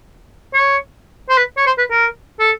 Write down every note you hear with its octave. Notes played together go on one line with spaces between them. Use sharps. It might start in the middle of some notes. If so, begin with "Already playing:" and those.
C#5
C5
B4
C#5
C5
B4
A#4
A4